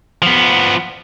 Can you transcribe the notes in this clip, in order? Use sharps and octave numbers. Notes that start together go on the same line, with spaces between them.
F3 B3